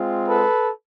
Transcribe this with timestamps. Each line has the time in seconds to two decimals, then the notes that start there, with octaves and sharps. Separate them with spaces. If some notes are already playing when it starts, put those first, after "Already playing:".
Already playing: G#3 C4 F4
0.27 A4 B4